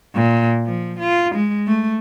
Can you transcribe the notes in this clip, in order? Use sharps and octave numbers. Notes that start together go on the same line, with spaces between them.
A#2
F3
F4
G#3
A3